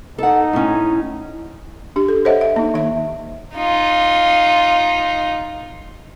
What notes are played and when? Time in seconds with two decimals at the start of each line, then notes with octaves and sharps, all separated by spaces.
0.18 D#4 A4 F#5
0.53 A2 C#4
1.96 D4 G4
2.08 A4
2.25 A4 C5 C#5 D#5 E5 F#5
2.41 E5
2.56 A#3 D#4
2.74 D#3 E5
3.55 D#4 F4